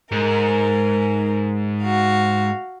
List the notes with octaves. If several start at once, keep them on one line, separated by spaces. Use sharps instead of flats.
G#2 A#4
F#4 F5